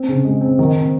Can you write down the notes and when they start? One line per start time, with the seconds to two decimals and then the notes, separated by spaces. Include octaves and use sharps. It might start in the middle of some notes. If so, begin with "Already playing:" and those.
Already playing: C4
0.08 C#3
0.25 G#3
0.41 C4
0.59 D#3
0.75 C4